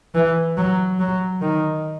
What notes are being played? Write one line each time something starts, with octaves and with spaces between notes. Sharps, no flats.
E3
F#3
F#3
D#3